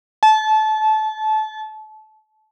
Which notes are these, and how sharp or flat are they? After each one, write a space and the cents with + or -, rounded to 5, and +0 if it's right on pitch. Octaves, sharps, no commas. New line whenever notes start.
A5 -25